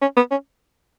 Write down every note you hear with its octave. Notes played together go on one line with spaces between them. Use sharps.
C#4
B3
C#4